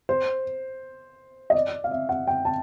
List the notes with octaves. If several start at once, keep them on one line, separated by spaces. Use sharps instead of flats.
C5
D#5
D5
F5
E5
F#5
G5
A5